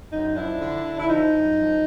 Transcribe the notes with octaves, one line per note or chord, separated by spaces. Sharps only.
F#2 D#4
F3 D4 E4
D3
D3
E4
F3 D#4
F#2
F3